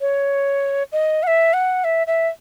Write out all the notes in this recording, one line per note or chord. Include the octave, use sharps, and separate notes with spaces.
C#5
D#5
F#5
E5
F#5
E5
E5